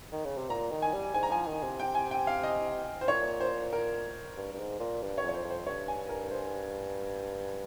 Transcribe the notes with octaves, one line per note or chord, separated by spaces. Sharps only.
D#3
C#3
C3
A#2 A#5
D#3
G#5
G3
G#2 G#5
A#5
F3 G#5
D#3
C3
G5
G#5
G5
F5
D#5
C5
A#2 C#5
C5
A#4
G2
G2
G#2
A#2
G2
C#5
F2
C#5
C5
F2
C5
G2 C#5
G#5
A#4
C5